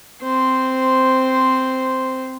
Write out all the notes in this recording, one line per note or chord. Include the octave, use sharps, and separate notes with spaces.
C4 C5